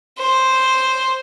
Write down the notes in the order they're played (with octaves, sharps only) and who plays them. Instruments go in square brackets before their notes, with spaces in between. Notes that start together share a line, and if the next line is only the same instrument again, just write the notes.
[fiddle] C5